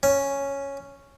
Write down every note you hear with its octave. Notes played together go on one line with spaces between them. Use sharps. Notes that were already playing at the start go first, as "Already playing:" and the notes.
C#4